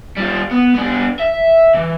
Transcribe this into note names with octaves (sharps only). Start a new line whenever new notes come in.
G3 F4
B3
B3 D4
E5
E3